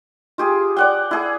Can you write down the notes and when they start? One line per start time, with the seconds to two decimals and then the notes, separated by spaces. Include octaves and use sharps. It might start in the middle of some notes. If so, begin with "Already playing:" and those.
0.38 F4 G4 G#4
0.77 D5 F#5 G5
1.11 E4 G#4